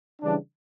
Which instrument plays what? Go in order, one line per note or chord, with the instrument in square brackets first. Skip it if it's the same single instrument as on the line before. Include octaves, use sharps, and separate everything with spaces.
[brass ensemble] C#3 E3 G3 D4